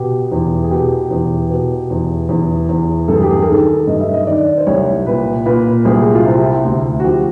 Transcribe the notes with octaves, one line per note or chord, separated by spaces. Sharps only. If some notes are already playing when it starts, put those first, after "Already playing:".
Already playing: B2 G4
E2
G#4
B2 G4
E2
B2
E2
E2
E2
G2 A4
G#4
G4
G#4
A#4
D#3 A4
G2 D#5
E5
D#5
D#3 D5
C5
C2 C#5
A#2 B4
A#2 B4
C2 G#4
F4
C3 E4
D2
F#4
F3 G4